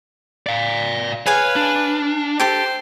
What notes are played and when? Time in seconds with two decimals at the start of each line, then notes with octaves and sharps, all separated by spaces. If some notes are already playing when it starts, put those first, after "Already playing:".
0.46 D5 F5
1.26 G#4 B4 C#5 F5 G#5
1.56 D4
2.40 G4 A4 C5 A5